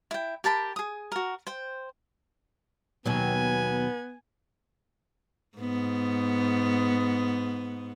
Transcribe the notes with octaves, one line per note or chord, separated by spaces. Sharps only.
E4 G5
G4 A#4 A5 B5
G#4 D#6
F#4 A#4
C5 G5
D#2 B2 F#3 B3 G#5
G#2 B3